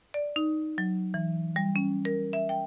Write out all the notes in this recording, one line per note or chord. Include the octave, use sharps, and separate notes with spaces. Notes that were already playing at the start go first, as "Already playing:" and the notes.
D5
D#4
F#3
E3
G3
C#4
A#4
E5
G5